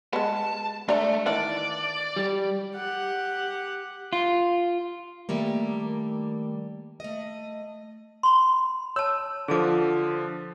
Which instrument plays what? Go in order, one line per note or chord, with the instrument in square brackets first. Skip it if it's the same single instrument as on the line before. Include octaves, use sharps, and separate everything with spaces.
[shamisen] G#3 B3 [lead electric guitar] A5
[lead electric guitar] A3 [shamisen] D4 A#5
[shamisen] D#3 E3 D4 [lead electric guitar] D5
[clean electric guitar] G3
[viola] G4 F#5
[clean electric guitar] F4
[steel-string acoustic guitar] D#3 G3 A3 A#3
A3 D#5
[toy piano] B5 C6
[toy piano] C#5 A5 [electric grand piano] E6
[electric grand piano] D3 F3 [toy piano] G#4 A5 D6